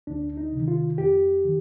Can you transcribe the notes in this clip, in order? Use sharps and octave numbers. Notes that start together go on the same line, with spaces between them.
D2 D4
D#4
C3 D#3
F4
F2 G4
D#3